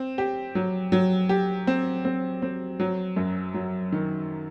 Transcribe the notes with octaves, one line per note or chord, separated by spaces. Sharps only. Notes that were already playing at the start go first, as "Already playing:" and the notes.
Already playing: C4
G4
F#3
F#3
G4
C4
C4
C4
F#3
F#2
F#3
D#3